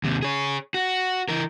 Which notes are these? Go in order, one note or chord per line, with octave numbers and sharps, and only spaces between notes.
D#2 C3
G#4 C#5
F#4
E3 A#4